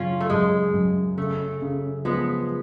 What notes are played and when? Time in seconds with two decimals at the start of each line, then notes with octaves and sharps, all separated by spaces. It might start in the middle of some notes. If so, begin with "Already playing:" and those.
Already playing: F#2 C#3 C#4 F4
0.20 A3
0.30 F#2 G#3
0.74 F#2
1.17 C#3 A3
1.62 C#3
2.05 F3 G#3 B3